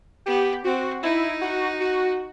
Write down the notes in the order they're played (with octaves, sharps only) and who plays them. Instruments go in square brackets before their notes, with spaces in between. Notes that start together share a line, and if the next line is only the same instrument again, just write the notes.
[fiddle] B3 [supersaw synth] G4
[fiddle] C4 [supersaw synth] F#4
[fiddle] D#4 [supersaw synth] E4
[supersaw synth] F#4
F#4